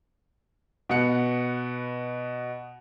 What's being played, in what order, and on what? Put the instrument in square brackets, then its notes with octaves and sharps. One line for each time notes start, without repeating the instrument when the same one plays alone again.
[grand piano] B2 B3 F#5 C#7